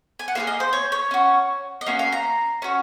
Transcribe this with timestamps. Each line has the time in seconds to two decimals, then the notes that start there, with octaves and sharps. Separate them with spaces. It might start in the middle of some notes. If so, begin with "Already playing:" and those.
0.19 G#5
0.28 F#5
0.35 A#3 F4 G#4 F5
0.47 D#5
0.60 C5
0.73 C#5
0.92 C#5
1.11 C#4 F#4
1.81 D#5
1.86 A#3 C#4 F#4 F5
1.99 F5
2.12 A#5
2.62 C#4 F#4